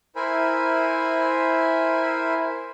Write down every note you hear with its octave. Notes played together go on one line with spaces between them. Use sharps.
E4 A#4 C5 E5 G#5 B5